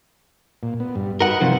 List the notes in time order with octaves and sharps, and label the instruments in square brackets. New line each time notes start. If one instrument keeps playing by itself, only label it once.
[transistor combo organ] A#2
B3
G2
[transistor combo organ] D#4 F#4 B4 [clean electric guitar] A#4 F#5
[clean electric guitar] C3 [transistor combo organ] F3 F#3 C4